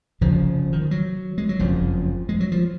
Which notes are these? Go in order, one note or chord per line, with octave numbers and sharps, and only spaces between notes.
F1 F2 C#3 F3
D#3
F3
F#3
G#3
F#3
F#1 F2 C#3 F3
G#3
F#3
F3